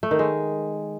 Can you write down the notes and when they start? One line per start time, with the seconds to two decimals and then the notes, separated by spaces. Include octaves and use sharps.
0.03 A3
0.11 D#3
0.19 G#3